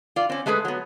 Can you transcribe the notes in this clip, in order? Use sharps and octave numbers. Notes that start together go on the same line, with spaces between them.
F4 D5
C4 C#4
G#3 A3 G#4 A#4 B4
F#3 B3